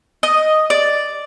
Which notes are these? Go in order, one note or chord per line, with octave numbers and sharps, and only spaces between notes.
D#5
D5